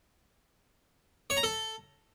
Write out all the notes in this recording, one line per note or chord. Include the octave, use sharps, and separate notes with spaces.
C#5
A#5
A4